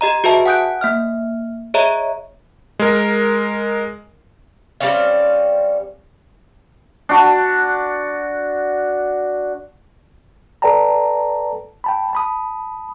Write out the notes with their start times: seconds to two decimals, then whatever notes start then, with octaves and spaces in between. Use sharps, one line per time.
0.01 G4 D#5 A#5
0.24 F#4 G#4 B4 E5 A5
0.46 F#5 G#5 D#6 F#6 G6 D7
0.81 A#3 E5 F6
1.74 G#4 C#5 D#5 E5 A#5
2.79 G#3 A#4
4.81 G3 C4 C#4 F5
7.09 D4 F#4
10.62 A4 B4 D5 G5 A5 A#5
11.84 G5 A5 B5
12.13 A5 B5 D#6